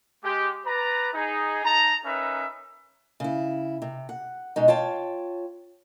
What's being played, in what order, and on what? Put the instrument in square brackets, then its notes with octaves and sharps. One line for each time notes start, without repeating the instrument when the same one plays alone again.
[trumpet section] G#3 G4
B4 D5 A#5
D#4 G#4
D#4 A5 A#5
C#4 D#4 A#4 B4 E5
[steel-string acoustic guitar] C#3 E4
C3
F#5
B2 G#3 D#4
F4 C#5 G5 A5